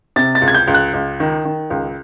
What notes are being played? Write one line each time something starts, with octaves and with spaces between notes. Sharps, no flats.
C3 A6
A6
C#2
G#6
G6
C#2
F#6
C#2
D#3
D#3
C#2